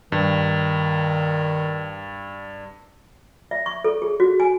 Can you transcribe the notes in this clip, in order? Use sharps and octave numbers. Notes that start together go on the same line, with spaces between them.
G2 D#3
E5
C#6
A4
G#4
F#4
G#5